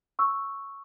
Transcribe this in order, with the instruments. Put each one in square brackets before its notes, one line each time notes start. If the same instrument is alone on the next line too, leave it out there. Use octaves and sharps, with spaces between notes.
[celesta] C#6 E6